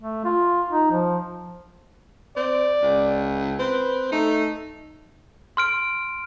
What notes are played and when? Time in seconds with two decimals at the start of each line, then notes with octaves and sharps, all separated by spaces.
0.01 A3
0.25 F4
0.68 D#4
0.91 F3
2.37 C4 D5
2.82 C#2
3.59 C4 B4
4.12 A3 D#4
5.57 C6 F6 D7